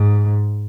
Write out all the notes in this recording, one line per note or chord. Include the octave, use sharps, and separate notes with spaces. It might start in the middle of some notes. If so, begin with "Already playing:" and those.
Already playing: G#2